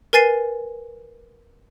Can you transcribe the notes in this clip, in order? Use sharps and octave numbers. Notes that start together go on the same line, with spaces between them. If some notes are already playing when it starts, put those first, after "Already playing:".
A#4 B4 G#5 A6 C7 D#7